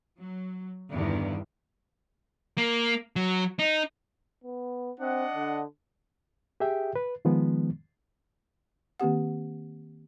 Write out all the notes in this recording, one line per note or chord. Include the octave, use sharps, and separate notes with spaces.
F#3
E2 G2 D3 D#3
A#3
F#3
D#4
B3
C4 D4 D#5 F#5
D3
G4 G#4 E5 G5
B4
D#3 F3 G#3 B3
D#3 A#3 C4 G4 F#5